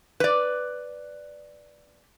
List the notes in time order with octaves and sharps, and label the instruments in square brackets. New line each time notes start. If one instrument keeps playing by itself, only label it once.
[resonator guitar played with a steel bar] B4 D5